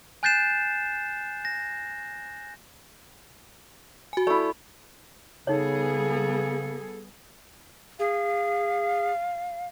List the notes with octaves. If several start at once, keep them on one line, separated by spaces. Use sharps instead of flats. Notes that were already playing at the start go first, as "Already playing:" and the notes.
G#5 F#6 G6 A6 C7 E7
A#6
F#4 G#5
A3 E4 D5
C#3 G3 B3 D#4 G#4 A4 C#5
G#4 F5